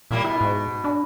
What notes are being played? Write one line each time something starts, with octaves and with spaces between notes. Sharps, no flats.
A#2 G3 A#3 E4
B2 E4
G#2
D4